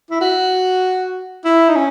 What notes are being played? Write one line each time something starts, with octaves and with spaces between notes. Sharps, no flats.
E4
F#4
E4
D#4
C#4